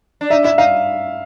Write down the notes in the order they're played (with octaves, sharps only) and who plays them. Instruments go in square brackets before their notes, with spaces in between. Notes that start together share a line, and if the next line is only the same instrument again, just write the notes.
[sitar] D4
[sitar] D#4 [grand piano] E5
[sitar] E4 [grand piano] E5
[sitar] D#4 [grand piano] F5